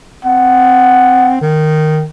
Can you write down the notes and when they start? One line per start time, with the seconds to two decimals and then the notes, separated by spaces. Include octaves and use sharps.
0.25 C4 F#5
1.41 D#3